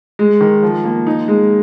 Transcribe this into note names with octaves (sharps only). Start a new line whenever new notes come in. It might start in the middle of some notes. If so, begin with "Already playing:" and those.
G#3
D#3
F3
A#3
D#4
G#3